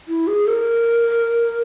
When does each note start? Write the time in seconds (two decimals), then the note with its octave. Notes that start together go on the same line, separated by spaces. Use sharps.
0.08 E4
0.27 G#4
0.47 A#4